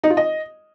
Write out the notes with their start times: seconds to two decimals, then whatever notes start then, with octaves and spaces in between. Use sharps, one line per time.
0.03 D#4
0.10 F4
0.17 D#5